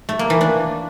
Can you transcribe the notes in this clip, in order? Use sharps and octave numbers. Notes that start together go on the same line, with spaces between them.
A3
A#3
E3
D4